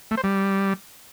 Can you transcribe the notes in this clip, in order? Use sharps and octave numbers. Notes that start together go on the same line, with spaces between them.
A3
C5
G3